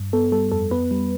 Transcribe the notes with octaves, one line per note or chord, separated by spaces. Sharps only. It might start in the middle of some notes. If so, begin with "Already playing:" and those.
Already playing: G2
B3 A4
G3 A4
F2 A4
B3 B4
G3